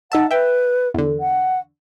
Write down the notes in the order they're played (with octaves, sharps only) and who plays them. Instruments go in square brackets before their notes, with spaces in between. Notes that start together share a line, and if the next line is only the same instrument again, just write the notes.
[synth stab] D#4 E5 A5 [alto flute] F#5
[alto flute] B4 [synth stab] E5 G5
[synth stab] E2 D3
[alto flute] F#5